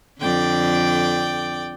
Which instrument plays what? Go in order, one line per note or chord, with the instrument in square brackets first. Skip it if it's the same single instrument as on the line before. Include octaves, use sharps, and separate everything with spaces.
[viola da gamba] F2 D3 [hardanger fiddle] D5 G5